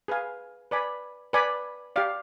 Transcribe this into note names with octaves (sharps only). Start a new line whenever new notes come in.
G#4 B4 F5 G#5
B4 D5 G#5 B5
B4 D5 G#5 B5
G4 D5 F5